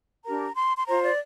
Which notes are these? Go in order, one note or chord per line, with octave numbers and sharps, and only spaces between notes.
D4 G4 A#4 A#5
C6
C6
F4 C5 A#5
D5